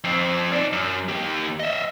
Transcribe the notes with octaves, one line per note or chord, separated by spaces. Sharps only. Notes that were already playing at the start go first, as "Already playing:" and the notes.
F2 C4
D#4 D5
F#2
D#2 G4
D#5 E5